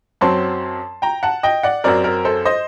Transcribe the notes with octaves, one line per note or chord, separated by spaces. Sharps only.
F#2 F#3 C4 A5 C6
G5 A#5
F#5 A5
D#5 G5
D5 F#5
F#2 F#3 C4 A#4 D5
A#4
A4 C5
C5 D#5